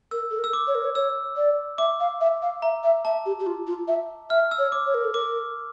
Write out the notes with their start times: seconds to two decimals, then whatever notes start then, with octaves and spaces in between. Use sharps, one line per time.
0.11 A#4 E6
0.31 A4
0.39 A#4
0.44 E6
0.53 D6
0.67 C#5
0.75 A#4
0.84 C#5
0.95 C#5 E6
1.37 D5
1.78 E5 D6
2.00 F5
2.21 E5
2.42 F5
2.62 E5 A#5
2.83 E5
3.05 E5 A5
3.26 G4
3.39 G4
3.46 F4
3.67 F4
3.88 E5
4.30 E5 F6
4.51 E6
4.59 C#5
4.72 D6
4.86 C#5
4.94 A#4
5.04 A4
5.13 A#4 D6